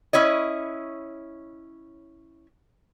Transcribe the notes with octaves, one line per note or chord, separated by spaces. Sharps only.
C#4 E4 C#5 D#5